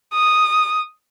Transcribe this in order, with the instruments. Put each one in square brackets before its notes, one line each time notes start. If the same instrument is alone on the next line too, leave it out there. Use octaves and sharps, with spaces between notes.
[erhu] D#6